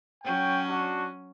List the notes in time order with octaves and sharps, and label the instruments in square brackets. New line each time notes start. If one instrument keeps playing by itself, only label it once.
[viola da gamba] F#3 C#4 [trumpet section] G5
[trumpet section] D4 F#4